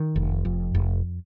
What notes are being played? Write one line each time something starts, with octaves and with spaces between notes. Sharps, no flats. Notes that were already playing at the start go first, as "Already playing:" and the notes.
Already playing: D#3
F1
F2
F1